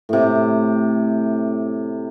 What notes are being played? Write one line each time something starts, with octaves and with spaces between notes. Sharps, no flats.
A2 C3